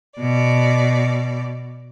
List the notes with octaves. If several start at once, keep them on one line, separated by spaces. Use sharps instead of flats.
B2 D5